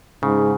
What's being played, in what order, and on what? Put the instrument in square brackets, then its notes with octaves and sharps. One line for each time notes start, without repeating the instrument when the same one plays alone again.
[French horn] G#2 [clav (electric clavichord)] C#3